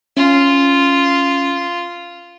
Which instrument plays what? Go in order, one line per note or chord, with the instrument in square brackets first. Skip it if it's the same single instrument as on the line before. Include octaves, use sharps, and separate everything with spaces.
[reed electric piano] C#4 [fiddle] F4